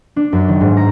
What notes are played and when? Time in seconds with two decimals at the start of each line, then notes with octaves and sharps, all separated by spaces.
0.16 D4
0.33 F#2
0.48 D#3
0.61 G#2
0.77 A#5